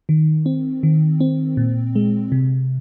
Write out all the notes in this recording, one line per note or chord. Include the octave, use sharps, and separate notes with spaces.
D#3
C4
D#3
C4
A#2
G#3
C3